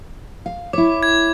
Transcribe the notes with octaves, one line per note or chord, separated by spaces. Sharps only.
F5
E4 C#5 D6
G#6